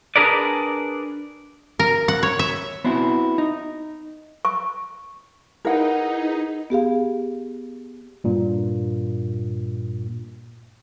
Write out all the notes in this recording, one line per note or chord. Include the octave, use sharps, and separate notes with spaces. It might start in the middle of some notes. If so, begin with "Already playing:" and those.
D4 G#4 A#4 B4 D5
A#4
F#5
C#5
E5
B3 C4 E4 F#4
D#4
C#6
D#4 E4 G#4 A#4 B4 F#5
B3 G4 G#4 F5
G2 A#2